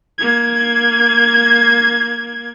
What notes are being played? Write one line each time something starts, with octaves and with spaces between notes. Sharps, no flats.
A#3 G#6